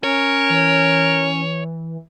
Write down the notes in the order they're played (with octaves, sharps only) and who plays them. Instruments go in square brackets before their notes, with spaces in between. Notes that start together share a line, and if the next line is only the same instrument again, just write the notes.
[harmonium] C#4 [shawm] A#4 [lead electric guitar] C#5
[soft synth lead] E3